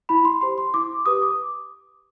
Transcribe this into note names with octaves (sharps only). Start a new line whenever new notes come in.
E4 B5
C6
G4 C5 C6
C6
E4 D6
G4 B4 D#6
D6